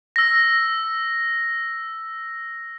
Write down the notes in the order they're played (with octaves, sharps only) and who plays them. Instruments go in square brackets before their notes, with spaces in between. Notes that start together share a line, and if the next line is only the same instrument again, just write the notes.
[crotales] E6 A#6